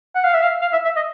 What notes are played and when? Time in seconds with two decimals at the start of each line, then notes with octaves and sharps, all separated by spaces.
0.15 F#5
0.24 F5
0.34 E5
0.42 F5
0.61 F5
0.73 E5
0.85 E5
0.96 D#5